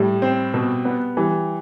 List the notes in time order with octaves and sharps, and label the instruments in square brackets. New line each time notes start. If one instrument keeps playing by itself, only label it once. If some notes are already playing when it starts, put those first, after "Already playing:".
Already playing: [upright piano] A2 [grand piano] G3
[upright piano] C4
B2
B3
[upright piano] E3 [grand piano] G3